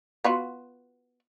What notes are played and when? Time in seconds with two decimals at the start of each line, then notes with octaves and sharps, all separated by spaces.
0.24 B3 F4 F#4